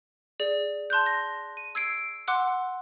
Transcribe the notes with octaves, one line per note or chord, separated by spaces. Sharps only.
G#4 D5
A5 C6 F#6 G6
A#6
D#7
E6 G#6 C7 D7
F#5 C6 D6 E6 F#6